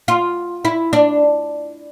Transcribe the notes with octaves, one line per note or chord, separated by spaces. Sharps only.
F4
E4
D4